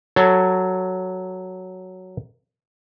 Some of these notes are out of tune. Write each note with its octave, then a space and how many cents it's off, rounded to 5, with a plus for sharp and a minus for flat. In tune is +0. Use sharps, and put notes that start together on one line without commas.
F#3 +0 A4 +10 C#5 +0